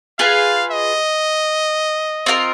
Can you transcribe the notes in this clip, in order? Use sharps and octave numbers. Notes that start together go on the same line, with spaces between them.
F4 G#4 B4 F5
D#5
C4 F4 A#4